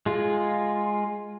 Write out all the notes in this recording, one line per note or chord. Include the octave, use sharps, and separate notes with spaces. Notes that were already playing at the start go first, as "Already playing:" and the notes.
G#3 F4